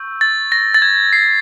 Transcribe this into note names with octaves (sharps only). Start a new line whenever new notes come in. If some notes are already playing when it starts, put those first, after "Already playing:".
Already playing: C#6 E6 G6
A6
A#6
A6
G#6
C7